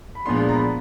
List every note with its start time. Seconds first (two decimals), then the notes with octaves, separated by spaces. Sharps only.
0.15 B5
0.26 A#2 F3 G#3 B3 D4 C6
0.40 C6
0.49 A#5
0.55 B5